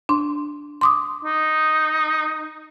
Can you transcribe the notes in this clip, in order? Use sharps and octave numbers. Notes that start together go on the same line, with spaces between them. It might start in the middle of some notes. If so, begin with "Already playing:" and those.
D4 C6
C6 D6 D#6
D#4